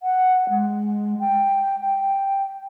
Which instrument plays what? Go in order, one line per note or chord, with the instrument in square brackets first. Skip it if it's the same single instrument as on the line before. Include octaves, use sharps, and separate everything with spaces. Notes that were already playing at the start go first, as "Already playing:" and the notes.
[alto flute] F#5
G#3
G5
G5